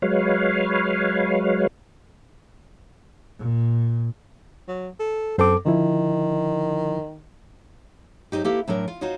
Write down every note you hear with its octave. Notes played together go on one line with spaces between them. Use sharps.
F#3 G#3 B4 C#5 F5
A#2
F#3
A4
F#2 C4 A4 D6
D3 D#3 F3 E4
G#2 F#3 D#4 G4
A#3 E4 G4 A4 B4
A2 F#3 D4 A#4
F4
D#4 F4 F#4 C5 C#5 D#5